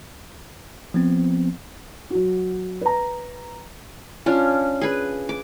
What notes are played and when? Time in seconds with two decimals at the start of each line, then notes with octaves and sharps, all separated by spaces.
0.94 F3 B3 C4
2.10 F#3 F#4
2.81 B4 A#5
4.26 C#4 D4 F4
4.81 G#4 B4
5.29 D6